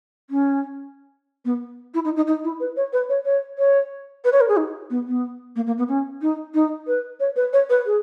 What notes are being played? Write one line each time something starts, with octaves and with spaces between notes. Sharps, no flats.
C#4
B3
E4
D#4
D#4
D#4
E4
B4
C#5
B4
C#5
C#5
C#5
B4
C#5
A#4
G#4
D#4
B3
B3
A#3
A#3
B3
C#4
D#4
D#4
B4
C#5
B4
C#5
B4
G#4